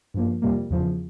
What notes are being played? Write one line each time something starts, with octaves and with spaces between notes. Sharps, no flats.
G2 F3 A#3
F2 C3 G3 A#3
E2 C#3 F3